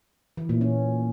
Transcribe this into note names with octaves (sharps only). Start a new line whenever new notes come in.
E3
A#2
C#4